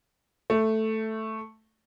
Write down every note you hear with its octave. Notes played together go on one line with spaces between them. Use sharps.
A3